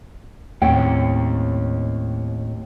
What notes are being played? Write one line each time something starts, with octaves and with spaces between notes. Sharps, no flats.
D#2 A2 C4 C#4 C#5 G5